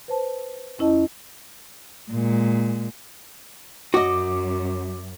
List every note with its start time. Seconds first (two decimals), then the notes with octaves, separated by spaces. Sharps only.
0.08 B4 C5 A5
0.78 F2 C#4 E4 D#5 A5
2.11 A#2 G#3
3.94 F#2 F#4 D#5 D6